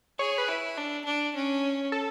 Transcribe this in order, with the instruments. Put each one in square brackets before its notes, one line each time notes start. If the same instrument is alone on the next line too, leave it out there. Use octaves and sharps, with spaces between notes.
[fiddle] G#4 [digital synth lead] C#5
[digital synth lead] B4
[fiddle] E4
D4
D4
C#4
[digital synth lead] A4